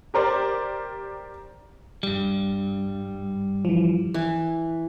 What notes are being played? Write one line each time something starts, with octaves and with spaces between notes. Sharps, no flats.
G4 A#4 C5 D5
G2 G3
E3 F3
E3